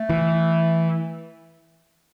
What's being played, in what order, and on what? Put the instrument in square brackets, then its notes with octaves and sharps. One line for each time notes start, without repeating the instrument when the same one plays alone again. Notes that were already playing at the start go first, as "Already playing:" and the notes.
Already playing: [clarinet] A3
[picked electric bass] E3